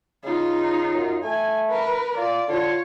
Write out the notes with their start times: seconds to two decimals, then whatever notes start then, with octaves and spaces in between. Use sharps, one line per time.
0.24 C#3 D#4 F4
0.94 F#2
1.24 A3 G#5
1.70 A#4 B4
2.17 F4 D5
2.48 D3 F4 C#5